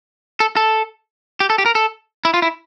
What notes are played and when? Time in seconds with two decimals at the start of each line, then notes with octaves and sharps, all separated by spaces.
0.40 A4
0.57 A4
1.40 G4
1.50 A4
1.58 G4
1.66 A#4
1.75 A4
2.25 E4
2.34 F4
2.42 E4